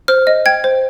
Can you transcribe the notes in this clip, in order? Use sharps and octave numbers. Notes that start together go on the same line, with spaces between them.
C5 F6
D#5
G5 G#6
C5